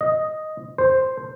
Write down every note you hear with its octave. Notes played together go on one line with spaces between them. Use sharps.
D#5
C5